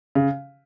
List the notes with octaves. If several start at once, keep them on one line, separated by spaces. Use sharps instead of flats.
C#3